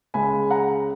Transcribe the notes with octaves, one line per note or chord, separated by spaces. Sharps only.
C#2 C#3 G#3 G#5 B5
F#5 A#5